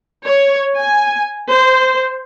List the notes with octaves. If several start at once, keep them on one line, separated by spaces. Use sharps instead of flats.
C#5
G#5
C5